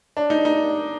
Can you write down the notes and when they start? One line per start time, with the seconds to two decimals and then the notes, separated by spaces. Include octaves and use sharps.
0.17 D4
0.30 D#4
0.45 D#4